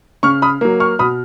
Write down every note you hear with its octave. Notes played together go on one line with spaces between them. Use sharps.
C#3 C#6 F6
B5 D#6
F#3 A#3
C#6 F6
B2 B5 D#6